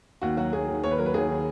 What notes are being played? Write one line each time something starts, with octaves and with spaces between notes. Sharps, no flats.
D#2 F#4
F#3 F#4
D#2 G#4
D#3
D#2 C#5
B4
F#3 A#4
B4
D#2 G#4
D#3